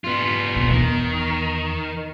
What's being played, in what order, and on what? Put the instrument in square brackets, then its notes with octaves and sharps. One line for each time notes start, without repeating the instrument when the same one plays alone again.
[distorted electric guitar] B3 F4
[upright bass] B2
[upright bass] E2 [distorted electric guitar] D#3